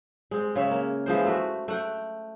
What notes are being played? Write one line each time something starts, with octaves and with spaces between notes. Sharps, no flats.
G#3 C4
C#3 C#5 E5
A#3
E3 F3 G#3 C5
A3 F#4
A3 F#5 G5